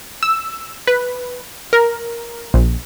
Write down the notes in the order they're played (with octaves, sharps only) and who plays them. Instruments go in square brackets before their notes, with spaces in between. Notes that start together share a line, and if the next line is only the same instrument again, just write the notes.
[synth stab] E6
B4
A#4
A#1